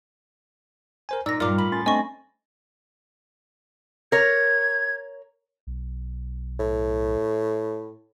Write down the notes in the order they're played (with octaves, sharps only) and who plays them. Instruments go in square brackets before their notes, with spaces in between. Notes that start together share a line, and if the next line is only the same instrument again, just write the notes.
[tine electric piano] A#4 C5 G#5
[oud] A#2 [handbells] D#4 [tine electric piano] D5 [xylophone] E6 A#6
[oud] G2 A#2 [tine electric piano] F4 A#4 F6 [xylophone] D5 D6
[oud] A2 [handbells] B5
[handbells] C#4 C6 A6
[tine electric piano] A3 C4 D4 [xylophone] D#5 C#6 [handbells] G#5 A#6
[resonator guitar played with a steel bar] A#4 C#5 [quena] G#6
[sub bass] B1
[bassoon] A2